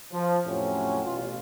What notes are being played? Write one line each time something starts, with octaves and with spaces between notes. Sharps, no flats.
F3
F2 A2 C3 F#3 C#4
A1 B2 F4